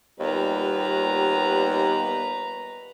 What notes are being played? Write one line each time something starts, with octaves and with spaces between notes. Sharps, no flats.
D#2 A#2 G3 B3 B4 A#5